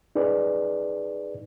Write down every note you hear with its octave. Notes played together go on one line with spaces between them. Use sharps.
D#4 G#4 B4 D5